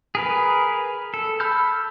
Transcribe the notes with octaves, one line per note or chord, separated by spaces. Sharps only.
G#4 A#4 B4
A4
A5 B5 E6 F6 G6